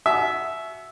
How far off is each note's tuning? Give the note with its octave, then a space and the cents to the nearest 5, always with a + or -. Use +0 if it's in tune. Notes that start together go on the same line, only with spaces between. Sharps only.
F#4 +0 E5 +0 G#5 +45